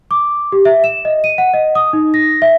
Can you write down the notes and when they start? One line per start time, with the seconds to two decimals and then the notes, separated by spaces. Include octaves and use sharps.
0.11 D6
0.52 G4
0.65 E5
0.84 E7
1.05 D#5
1.24 D#7
1.38 F#5
1.54 D#5
1.75 D#6
1.93 D#4
2.14 A#6
2.42 E5